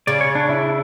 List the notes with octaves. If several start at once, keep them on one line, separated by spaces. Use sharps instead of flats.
C#3 D5
C#5
D4
E4